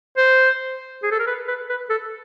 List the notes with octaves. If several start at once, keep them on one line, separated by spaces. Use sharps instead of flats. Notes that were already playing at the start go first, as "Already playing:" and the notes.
C5
G#4
A4
A#4
B4
B4
B4
A4